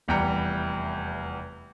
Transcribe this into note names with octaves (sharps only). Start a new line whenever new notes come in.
F1 E2 G3 G5 A#5 C#7